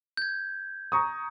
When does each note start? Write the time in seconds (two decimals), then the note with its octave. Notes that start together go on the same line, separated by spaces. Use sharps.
0.17 G6 G#6
0.92 A#5 C#6 D#6